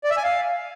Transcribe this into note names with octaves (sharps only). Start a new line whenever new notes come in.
D5
E5
G#5
F5